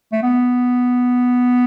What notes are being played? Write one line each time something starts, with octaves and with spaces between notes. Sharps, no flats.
A3
B3